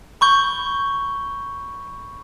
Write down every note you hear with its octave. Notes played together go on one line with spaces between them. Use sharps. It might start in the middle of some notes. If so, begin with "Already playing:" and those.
B5 C#6 G6 G7